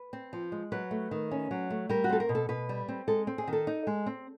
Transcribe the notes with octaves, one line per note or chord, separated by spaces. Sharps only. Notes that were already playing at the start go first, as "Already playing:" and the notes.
Already playing: B4
C4
F3
G#3
F#3 B4
A3
D#3
C#4
F#3
A3
G3 A#4
F#4
C4 A4
A#4
B2
A4
B2 B4
G3
C4
G#3 A4
C4
G#4
D#3
A4
D#4
G#3
C4